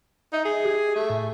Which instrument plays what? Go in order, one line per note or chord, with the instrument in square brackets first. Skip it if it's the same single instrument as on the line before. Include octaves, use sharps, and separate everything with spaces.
[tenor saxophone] D#4 [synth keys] E5
[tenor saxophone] G#4
[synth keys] G4 G#6
[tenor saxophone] A3
[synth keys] A2